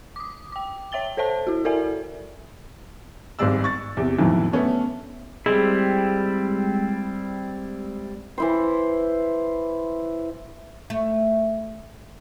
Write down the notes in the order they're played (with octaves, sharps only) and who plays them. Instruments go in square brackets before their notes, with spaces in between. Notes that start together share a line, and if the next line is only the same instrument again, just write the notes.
[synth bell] D6 D#6
G5 D6
C#5 E5 G5 A6 G7
A4 C5 C#5 E5 A5
E4 F#4
E4 A4 A#4 D5 E5 G#5
[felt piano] G#1 G2 G#3 G#4 D5 E6
C#6 A6
E2 C3
B1 F2 A2 D#3 E3 F#3
A3 B3 C#4 D4
[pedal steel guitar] G3 C4 E4 [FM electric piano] G#3
[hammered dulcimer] E3 E4 C5
[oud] A3